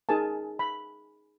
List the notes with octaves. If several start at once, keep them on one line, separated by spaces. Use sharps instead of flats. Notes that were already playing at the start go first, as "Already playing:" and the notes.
D#4 G#4 A#4 G#5 A5
B5